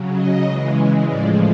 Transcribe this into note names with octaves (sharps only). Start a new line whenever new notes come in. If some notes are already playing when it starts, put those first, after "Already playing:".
Already playing: C#3 F#3
D#5
C#3 E3 G#3
A2 F3 G#3 D5